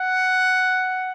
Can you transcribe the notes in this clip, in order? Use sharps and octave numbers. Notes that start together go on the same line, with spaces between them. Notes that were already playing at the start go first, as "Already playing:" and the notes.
Already playing: F#5